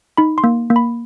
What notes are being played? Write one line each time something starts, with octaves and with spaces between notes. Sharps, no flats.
D#4 B5
C6
A#3
A#3
B5